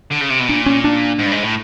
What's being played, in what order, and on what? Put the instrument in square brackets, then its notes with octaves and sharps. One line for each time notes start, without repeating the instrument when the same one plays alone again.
[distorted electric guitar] D3
C#3
C3
B2
[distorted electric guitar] A#2 [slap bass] D4
[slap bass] C#4
D4
[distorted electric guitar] G#2
G2
G#2
A2